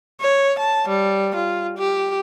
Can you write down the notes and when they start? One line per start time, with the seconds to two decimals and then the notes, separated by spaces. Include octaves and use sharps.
0.21 C#5
0.59 A5
0.88 G3
1.35 F4
1.78 G4